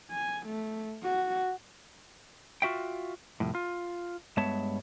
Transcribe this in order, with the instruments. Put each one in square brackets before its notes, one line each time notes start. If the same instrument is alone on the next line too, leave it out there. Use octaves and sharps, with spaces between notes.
[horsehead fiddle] G#5
A3
F#4
[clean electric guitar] F4 F#4 E5 G5
C2 F2 A2
F4
G2 G#3 B3 C#5 E5 A5